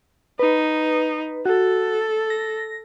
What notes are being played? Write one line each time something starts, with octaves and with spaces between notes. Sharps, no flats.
D#4 B4
F#4 A4
A#6